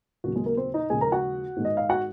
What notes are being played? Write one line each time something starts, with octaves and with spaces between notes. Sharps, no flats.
D#2 C#3 F#3 F#4
G#3 G#4
A#3 A#4
C4 C5
D#4 D#5
D#2 C#3 F3 G#3 G#4 G#5
A#4 A#5
F#4 F#5
G#2 D#3 G#3
D#5
F5
F#4 F#5